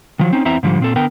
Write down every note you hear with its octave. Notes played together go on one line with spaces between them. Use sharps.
D#3 F3 F#3
C4 C#4 D#4
E2 B3 C4 E4 E5 A#5
G#2 D3 F3 G3
A#2 C4 A4
D3 B3 A#4 G5